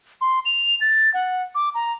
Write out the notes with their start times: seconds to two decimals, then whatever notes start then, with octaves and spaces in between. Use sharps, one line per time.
0.21 C6
0.45 F7
0.81 A6
1.14 F#5
1.55 D6
1.75 A#5